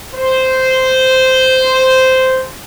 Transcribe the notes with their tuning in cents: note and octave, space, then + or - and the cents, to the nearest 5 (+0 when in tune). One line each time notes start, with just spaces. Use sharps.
C5 -10